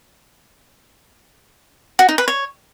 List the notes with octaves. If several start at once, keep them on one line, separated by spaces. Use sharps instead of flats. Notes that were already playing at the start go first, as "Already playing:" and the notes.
F#4
D#4
B4
C#5